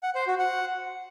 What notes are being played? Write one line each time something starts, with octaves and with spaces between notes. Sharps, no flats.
F#5
C5
F#4
F#5